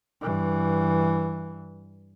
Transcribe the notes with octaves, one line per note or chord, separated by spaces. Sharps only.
G2 E3